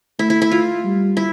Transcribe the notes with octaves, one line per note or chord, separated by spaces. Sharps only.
A3 E4
E4
E4
F4
G3
E4